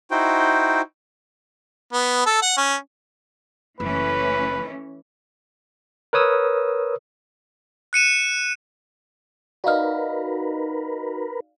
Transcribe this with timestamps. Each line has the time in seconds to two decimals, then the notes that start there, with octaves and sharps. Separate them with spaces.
0.11 D#4 E4 F#4 C5 G5
1.93 B3
2.26 A4
2.42 F#5
2.57 C#4
3.80 F#1 E3 A3 C#4 B4
6.13 A#4 B4 C#5 D#6 E6
7.93 F#6 C#7 D#7 E7
9.64 D#4 F#4 A#4 B4 D5 F5 F6